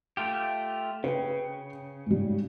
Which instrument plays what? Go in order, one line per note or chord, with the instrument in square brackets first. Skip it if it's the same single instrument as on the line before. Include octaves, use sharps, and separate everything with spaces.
[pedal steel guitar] A3 F4 G4
[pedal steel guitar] C#3 [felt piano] B4 G5
[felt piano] G#2 G3